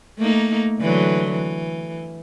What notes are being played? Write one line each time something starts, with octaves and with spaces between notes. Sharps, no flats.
A3 A#3 D#4
D3 E3 F#3
E3